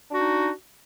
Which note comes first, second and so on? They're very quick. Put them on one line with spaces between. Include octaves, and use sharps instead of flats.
D4 F#4 D#4